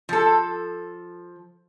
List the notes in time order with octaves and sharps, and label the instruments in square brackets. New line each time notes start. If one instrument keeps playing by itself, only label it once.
[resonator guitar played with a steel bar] F3 A4